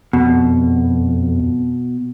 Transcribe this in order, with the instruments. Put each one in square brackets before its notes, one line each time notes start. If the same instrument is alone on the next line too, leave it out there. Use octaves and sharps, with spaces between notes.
[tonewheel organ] F2 [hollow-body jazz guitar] B2